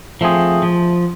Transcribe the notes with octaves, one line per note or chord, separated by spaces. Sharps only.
F3 A3 C4 G#4
F3